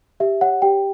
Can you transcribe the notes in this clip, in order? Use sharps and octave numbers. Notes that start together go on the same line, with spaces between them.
G4 E5
C#5 F#5
G4 G5